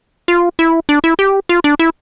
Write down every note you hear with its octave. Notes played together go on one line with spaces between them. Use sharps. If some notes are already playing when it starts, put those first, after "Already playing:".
F4
E4
D4
E4
G4
F4
D4
E4